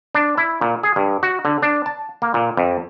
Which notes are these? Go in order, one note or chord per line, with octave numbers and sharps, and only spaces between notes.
D4
E4
A#2
G#4
G2
F#4
D3
D4
A5
A#3
A#2
F2